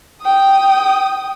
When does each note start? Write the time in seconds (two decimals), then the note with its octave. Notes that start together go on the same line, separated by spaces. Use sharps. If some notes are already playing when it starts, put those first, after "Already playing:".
0.22 G5 D#6